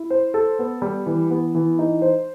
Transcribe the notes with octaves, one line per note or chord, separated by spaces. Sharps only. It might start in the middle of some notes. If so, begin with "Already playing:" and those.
Already playing: E4
C5
A4
B3
G3
E3
B3
E3
D#4
C5